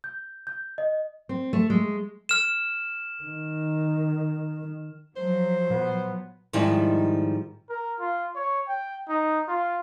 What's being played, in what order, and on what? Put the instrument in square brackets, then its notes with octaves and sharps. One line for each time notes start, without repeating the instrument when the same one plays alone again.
[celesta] G6
G6
D#5
[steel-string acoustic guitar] C4
A3
G#3
[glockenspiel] F6 E7
[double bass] D#3
[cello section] F3 F#3 [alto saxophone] C5
[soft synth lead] A#2 [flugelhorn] B3
[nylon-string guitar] G#2 D#3 F3 G3 E4
[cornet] A#4
F4
C#5
G5
D#4
F4